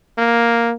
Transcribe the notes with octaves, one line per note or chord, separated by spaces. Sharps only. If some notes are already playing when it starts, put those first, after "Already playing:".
A#3